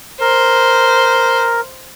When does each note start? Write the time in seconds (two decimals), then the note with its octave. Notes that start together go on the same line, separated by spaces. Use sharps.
0.21 A#4 C5